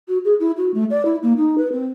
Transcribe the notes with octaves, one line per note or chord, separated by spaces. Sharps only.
F#4
G#4
E4
F#4
A3
D5
E4
A#3
D#4
B4
C4